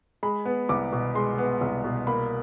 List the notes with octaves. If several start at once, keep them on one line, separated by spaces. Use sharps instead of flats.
G#3 B5
B3
C2 D6
B2
G#3 C6
B3
C2
B2
A#3 B5